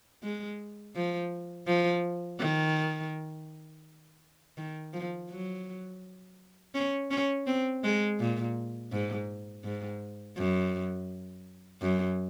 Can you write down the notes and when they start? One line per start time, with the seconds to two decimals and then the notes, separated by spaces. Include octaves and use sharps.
0.23 G#3
0.96 F3
1.67 F3
2.40 D#3
4.57 D#3
4.93 F3
5.30 F#3
6.75 C#4
7.11 C#4
7.47 C4
7.84 G#3
8.19 A#2
8.92 G#2
9.64 G#2
10.37 F#2
11.81 F#2